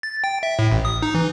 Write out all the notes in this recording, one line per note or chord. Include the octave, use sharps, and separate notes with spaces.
A6
G5
E5
A2
A1
D#6
D#4
E3